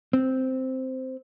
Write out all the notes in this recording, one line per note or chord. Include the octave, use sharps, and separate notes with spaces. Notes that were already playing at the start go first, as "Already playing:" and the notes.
C4